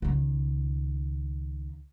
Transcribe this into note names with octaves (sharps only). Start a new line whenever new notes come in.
C#2 D#3